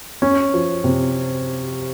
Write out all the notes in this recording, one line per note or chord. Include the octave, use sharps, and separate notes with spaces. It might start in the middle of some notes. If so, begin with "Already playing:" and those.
C#4
F3
C3